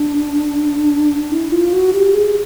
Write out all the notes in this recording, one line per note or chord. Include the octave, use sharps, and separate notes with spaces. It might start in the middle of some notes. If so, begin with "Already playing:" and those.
Already playing: D4
E4
F4
F#4
G4
G#4